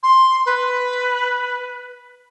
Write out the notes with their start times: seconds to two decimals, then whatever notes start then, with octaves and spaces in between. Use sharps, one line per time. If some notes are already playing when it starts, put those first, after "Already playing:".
0.03 C6
0.45 B4